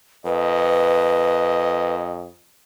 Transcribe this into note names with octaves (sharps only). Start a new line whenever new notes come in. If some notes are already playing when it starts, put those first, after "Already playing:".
F2 B4 D#5